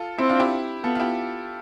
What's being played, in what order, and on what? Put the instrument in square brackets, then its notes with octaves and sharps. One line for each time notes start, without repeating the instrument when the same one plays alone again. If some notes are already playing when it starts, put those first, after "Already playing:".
Already playing: [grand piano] F4 A4
[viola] C4 [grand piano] E4
[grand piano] D4 F4
E4 G4
[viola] B3 [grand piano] F4 A4
[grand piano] F4
E4 G4